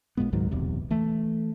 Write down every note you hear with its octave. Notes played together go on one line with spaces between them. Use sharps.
A#1 A#2 G#3 B3
C#2 G#2 D#3 F#3
D1 B1 E2 C3
E3 A3